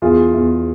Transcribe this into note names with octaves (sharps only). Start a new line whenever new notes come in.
E2 F4 G#4
E2